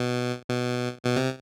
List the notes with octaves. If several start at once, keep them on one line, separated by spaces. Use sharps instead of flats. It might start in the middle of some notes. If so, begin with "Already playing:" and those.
Already playing: B2
B2
B2
C3